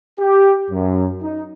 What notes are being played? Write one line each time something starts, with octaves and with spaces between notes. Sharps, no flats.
G4
F#2
D#4